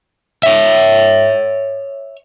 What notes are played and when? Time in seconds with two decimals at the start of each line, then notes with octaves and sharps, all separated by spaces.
0.43 C#5 E5